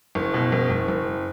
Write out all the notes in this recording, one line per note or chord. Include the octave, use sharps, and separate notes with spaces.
F#1
B2
F#1
F#1
F#1